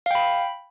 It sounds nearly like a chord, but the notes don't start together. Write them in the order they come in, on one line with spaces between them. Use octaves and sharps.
F5 G5 B5